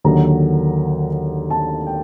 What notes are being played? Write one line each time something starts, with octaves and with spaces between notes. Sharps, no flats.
D#2 D3 F#3 A#5
A5
G5